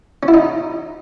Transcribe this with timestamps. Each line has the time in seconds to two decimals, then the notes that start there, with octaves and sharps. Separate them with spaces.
0.23 C#4
0.28 E4
0.34 D#4